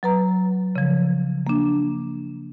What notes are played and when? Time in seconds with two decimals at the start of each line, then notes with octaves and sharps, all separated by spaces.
0.03 F#3 B4 A#5
0.76 C#3 F3
1.47 A#3 D4